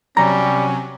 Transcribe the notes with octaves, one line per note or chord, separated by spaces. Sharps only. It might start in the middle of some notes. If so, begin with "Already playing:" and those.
C3 F#3 G3 C#4 A#5